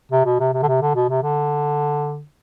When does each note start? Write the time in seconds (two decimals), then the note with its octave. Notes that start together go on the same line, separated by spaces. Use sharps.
0.12 C3
0.26 B2
0.40 C3
0.53 C3
0.63 D3
0.68 C3
0.81 D3
0.95 B2
1.10 C3
1.22 D3